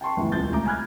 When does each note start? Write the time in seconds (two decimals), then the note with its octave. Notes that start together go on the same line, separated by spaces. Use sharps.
0.01 G5 A5 C6 C#6
0.17 G1 D2 E3
0.32 D#1 C#2 G6 A6
0.52 D2 A#5 D6
0.65 G#5 A#5 B5 F6 F#6 G#6